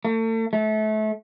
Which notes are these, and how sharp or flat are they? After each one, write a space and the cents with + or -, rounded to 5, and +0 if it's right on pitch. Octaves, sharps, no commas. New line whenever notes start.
A3 +40
A3 -30